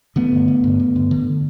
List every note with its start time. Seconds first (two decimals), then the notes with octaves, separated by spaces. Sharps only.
0.16 D3 A3 B3
0.32 G2
0.48 D3
0.64 G2
0.80 D3
0.96 G2
1.11 D3